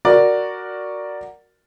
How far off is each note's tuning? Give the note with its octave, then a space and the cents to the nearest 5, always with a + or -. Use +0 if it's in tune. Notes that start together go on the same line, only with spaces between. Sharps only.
F#4 +0 A#4 +0 D5 +0